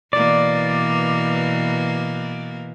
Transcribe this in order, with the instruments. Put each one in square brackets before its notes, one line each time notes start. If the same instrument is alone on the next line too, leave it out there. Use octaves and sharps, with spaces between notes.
[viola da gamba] B2 E3 A#3 [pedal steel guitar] D5